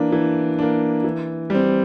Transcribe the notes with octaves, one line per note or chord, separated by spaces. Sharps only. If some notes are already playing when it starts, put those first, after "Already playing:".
Already playing: E3 A#3 D4
E3
A#3 D4
E3
G3 C4